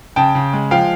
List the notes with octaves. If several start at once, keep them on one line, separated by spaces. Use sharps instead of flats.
C#3 G5 A5
C#3
G#3
F3 F5 G5